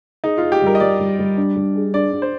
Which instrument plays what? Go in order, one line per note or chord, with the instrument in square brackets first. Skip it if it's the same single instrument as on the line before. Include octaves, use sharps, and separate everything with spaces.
[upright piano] D#4 [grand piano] G#4
[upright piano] F4
[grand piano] G#4
[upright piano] G4
[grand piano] G3 [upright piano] A#4
[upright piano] D#5
[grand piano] G3 [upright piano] D5
[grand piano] G3
G3
D4
G3
G#4
[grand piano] D4 [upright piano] D5
[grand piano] D4
[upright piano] C5